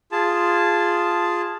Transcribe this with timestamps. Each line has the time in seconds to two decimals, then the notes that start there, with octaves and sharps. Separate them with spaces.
0.12 F4 G#4 A5